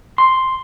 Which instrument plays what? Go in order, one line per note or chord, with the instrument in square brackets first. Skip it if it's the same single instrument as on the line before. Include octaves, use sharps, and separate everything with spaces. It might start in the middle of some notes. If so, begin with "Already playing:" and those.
[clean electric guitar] C6